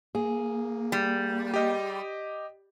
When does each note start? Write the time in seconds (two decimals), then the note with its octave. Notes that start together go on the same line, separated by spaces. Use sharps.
0.15 A#3 G#4
0.92 G3
1.54 G4 D#5